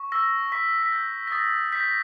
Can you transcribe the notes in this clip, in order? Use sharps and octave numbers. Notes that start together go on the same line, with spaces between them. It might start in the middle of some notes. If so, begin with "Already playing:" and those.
Already playing: C#6
E6 A#6
C#6 B6
B6
G6 A#6
A#6
D#6 A6
G6 B6
A#6